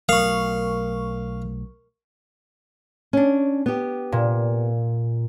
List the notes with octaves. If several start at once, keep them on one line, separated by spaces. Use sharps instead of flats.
B1 F#3 A3 A#4 F5 C#6
C#4 D4
B3 G4
A#2